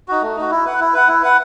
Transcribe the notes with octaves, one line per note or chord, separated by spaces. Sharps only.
D#4 F#4
A3
D#4 F#4
E4
B4 F#5
E4
B4 F#5
E4
B4 F#5